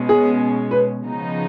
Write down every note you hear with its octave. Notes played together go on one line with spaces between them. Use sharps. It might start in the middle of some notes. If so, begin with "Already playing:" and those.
Already playing: B2 G#3 C#4
G#4
B4
C#3 F3 B3 D#4